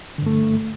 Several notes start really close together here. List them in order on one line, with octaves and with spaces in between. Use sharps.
D3 G2 A3